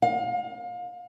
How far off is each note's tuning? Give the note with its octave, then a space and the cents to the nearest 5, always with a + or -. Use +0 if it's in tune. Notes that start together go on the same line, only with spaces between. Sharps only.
F5 +35